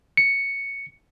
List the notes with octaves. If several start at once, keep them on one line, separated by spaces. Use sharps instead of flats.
C#7